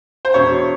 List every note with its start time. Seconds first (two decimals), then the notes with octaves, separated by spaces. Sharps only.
0.25 C5
0.34 E1 C#5